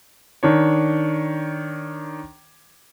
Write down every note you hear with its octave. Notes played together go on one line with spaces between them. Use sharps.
D#3 D4 C#5